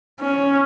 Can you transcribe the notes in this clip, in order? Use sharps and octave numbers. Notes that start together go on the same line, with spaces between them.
C#4